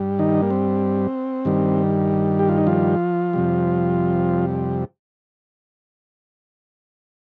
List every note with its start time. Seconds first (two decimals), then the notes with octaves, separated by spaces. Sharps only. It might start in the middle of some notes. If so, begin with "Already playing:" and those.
Already playing: G2 G3
0.19 D#3 D#4
0.42 A#3
0.50 C4
1.45 G2 D#3 G3
2.39 G4
2.49 F4
2.58 D#4
2.67 F3 F4
3.33 F2 C3 G3